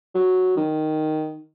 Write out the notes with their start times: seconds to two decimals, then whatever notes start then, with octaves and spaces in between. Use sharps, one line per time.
0.14 F#3
0.57 D#3